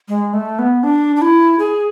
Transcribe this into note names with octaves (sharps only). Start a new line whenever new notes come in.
G#3
A3
B3
D4
D4
E4
G#4